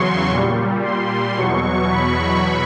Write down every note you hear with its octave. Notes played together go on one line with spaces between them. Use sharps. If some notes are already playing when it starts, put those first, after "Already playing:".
Already playing: E2 C#3 F#3 C6 C#6
A#2 G3
C6
E2 B2 F#3 C#6
B5